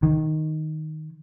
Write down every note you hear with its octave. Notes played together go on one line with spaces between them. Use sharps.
D#3